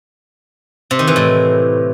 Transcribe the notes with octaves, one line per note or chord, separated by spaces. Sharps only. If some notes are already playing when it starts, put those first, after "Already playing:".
C3
D#3
E3
A2